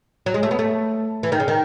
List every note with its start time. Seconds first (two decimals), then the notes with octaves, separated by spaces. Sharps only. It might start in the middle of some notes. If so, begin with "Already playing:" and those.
0.26 F#3
0.34 G#3
0.43 A3
0.51 B3
0.59 A3
1.23 E3
1.32 D#3
1.40 C#3
1.48 D#3